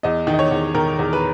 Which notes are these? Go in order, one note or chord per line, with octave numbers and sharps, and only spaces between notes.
E2 D#5
D#3
D#5
C#5
E2
D#3 A#4
E2
B4